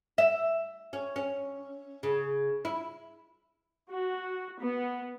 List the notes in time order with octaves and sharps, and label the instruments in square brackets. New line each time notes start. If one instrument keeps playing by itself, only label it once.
[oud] E5
C#4
C#4
C#3
E4
[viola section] F#4
B3